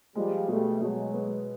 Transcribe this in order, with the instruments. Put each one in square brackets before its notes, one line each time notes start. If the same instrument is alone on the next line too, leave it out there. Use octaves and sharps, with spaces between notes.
[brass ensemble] F3 G3 [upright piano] G#3
[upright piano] B2 [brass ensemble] G3 A3
[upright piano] B2 [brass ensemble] F#3 G#3
[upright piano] B3